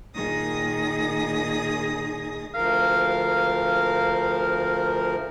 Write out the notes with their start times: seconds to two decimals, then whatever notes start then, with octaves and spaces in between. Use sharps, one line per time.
0.14 A#2 D#3 G#4 D#6 A#6
2.55 D2 F3 A#4 F5